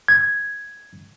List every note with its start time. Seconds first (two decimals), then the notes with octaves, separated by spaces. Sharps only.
0.08 G#6